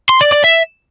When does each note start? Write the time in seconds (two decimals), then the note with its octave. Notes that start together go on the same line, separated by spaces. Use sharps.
0.09 C6
0.21 D5
0.32 D5
0.44 E5